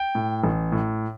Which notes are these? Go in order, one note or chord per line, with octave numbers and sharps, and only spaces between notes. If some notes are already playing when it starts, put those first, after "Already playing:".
Already playing: G5
A2
A1
A2